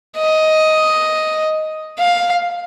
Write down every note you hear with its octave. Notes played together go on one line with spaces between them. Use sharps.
D#5
F5